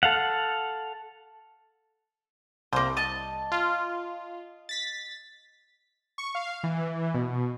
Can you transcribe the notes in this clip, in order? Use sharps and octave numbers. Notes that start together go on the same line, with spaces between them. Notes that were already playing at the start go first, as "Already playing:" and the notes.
A4 F5 F#5
C2 A#3 C5
D#5 A5
F4
A6 B6
C#6
F5
E3
B2